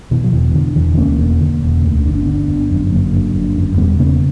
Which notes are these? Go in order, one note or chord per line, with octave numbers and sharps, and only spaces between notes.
B2 E3
F#3
E1 E3
D3
E1 E3
D2 A#3 C#4
E1
D3
E1
D2
G1 D4
C#4
D3 B3 D4
G1
F#2
G1 F#3 A#3
D3
G1
F#2
E1 G3 B3
C#3 A#3 C#4